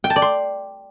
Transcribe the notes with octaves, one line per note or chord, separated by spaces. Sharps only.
G5
A5
D5
C6